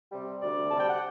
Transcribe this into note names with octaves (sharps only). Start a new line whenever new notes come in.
C3 G3
D2 D5
C3 G3 A5
G5
F#5